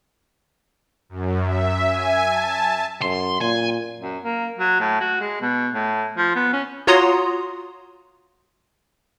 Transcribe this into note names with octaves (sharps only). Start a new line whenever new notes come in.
F#2
E5
G#5
A5
F#2 C6
A#2 G#5
F#2
A#3
F#3
A2
F#4
G#3
B2
A2
F3
B3
C#4
F4 F#4 C#5 A#5 C6 D#6